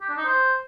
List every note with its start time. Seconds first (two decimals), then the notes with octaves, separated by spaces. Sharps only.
0.01 G4
0.09 D4
0.17 D#4
0.25 C5